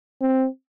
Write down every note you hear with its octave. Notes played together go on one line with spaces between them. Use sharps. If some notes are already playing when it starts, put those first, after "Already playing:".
C4